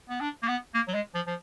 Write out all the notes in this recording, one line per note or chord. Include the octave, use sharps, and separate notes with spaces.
B3
D4
A#3
B3
A#3
F#3
G#3
F3
F3